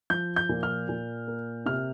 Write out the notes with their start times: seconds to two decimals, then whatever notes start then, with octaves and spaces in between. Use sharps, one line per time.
0.10 F3 G6
0.36 G6
0.49 A#2
0.63 F6
0.89 A#2
1.28 A#3
1.66 C3 F6